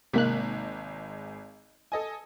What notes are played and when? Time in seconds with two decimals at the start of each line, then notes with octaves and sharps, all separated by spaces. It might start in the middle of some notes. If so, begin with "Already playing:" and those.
0.13 G#1 C3 G#3 A#3 F#6 B6
1.92 A4 D#5 G#5